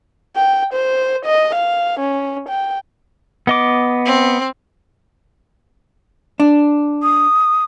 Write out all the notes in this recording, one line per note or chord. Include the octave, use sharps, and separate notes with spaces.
G5
C5
D#5
F5
C#4
G5
B3 D#5 D6
C4
D4
D#6